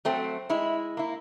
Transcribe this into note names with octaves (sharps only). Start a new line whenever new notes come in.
F#3 A3 C4
G#3 E4
A#3 E4